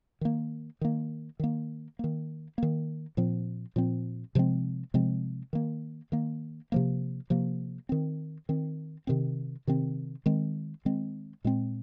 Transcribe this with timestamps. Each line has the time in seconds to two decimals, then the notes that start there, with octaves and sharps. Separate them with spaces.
0.21 D#3 A#3
0.81 D#3 A#3
1.39 D#3 A#3
1.99 D#3 A#3
2.58 D#3 A#3
3.17 A#2 F3 C4
3.76 A#2 F3 C4
4.35 C3 F3 G#3 C4
4.94 C3 F3 G#3 C4
5.53 D#3 A#3
6.12 D#3 A#3
6.72 C3 F3 A#3
7.30 C3 F3 A#3
7.89 D#3 C4
8.49 D#3 C4
9.07 C3 D#3 C4
9.67 C3 D#3 C4
10.26 D#3 G#3 C4
10.85 D#3 G#3 C4
11.45 A#2 G#3 C4